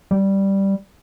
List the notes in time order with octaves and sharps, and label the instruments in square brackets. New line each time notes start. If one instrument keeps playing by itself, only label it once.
[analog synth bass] G3